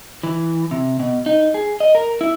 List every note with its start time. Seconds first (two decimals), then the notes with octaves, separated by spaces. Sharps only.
0.23 E3
0.71 C3
1.00 B2
1.26 D#4
1.54 G#4
1.80 D#5
1.95 A#4
2.21 E4